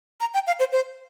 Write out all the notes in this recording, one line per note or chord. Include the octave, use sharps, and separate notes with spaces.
A#5
G5
F5
C5
C5